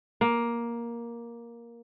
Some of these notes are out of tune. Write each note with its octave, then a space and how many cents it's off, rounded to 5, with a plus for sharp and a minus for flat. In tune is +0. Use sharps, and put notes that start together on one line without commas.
A#3 +10